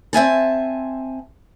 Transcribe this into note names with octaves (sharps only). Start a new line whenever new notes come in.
C4 E5 G#5 A5